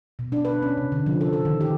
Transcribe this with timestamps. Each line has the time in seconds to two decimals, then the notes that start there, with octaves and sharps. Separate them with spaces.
0.19 B2
0.32 D4
0.45 B4
0.62 C#4
0.78 C3
0.92 D3
1.06 F3
1.21 A4
1.33 A4
1.45 D#3
1.61 G4